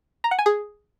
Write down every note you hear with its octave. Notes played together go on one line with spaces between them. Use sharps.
A#5
F#5
G#5
G#4